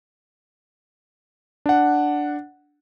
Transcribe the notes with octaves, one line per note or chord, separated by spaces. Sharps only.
D4 F#5